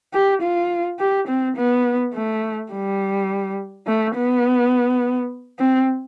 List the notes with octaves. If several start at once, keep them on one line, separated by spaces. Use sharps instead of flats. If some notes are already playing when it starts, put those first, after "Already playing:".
G4
F4
G4
C4
B3
A3
G3
A3
B3
C4